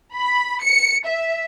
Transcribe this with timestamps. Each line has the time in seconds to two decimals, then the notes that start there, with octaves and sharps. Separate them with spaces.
0.15 B5
0.63 C#7
1.06 E5